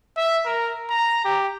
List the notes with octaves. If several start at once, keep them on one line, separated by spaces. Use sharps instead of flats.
E5
A#4
A#5
G4